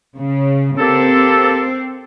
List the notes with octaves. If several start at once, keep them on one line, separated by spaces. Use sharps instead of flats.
C#3
A#3 C4 G4 A4